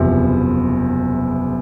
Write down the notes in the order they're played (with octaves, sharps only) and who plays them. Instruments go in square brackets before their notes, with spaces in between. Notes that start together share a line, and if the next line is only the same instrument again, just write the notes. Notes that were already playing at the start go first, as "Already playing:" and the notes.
Already playing: [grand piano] F#1 E2 C3 F3